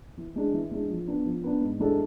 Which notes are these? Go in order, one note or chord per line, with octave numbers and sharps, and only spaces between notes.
E3
G#3 D4
E3
G#3 D4
F3
B3 D4
F3
B3 D4
G#2
E3 G#3 D4 A4